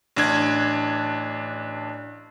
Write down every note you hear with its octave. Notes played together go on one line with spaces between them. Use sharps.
A1 D4 G#6